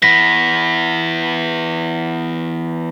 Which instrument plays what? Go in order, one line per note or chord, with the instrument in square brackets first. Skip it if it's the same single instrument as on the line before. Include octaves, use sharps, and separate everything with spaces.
[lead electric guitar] E3 B3 [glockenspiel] A#6 B6